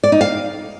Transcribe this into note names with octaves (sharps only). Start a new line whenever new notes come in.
D5
D#4
F5